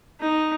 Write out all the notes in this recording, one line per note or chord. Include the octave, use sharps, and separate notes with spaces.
D#4